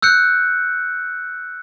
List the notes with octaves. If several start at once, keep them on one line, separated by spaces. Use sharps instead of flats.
E6 F#6 G6 C#7